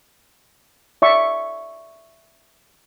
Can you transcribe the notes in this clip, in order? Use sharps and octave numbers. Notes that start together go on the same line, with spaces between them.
D5 E5 C#6